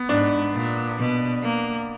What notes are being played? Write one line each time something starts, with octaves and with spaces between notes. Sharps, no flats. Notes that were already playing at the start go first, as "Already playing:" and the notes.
Already playing: B3
G#2 D4
A#2
B2
A#3